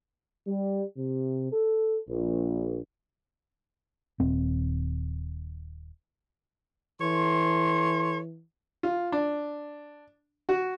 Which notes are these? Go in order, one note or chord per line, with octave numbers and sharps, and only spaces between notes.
G3
C3
A4
A#1
D#1 C4
E3 A4 C#5 C6
F4
D4
F#4